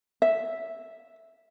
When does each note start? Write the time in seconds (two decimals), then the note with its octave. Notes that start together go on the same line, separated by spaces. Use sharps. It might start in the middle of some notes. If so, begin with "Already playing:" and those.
0.22 E5